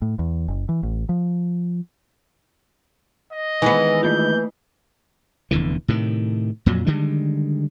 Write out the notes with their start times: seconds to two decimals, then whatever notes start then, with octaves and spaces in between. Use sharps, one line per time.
0.02 A2
0.19 E2
0.48 F#1
0.69 E3
0.83 A1
1.09 F3
3.33 D#5
3.62 D#3 E3 G#3 B3 G#5
4.03 A3 A#3 F4 G6
5.51 F1 E2 D3 E3
5.88 A2 C3 D#3
6.66 F2 A#2 F#3
6.86 D3 D#3 G3 G#3